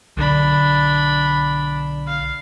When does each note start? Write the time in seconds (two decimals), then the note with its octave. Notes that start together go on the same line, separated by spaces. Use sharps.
0.17 B1 D3 D4 B5
2.06 F5